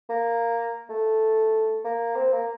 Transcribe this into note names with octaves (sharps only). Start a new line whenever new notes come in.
A#3
A3
A#3
C4
A#3